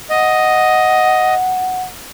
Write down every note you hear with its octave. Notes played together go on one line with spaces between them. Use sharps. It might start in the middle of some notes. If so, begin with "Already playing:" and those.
D#5 F#5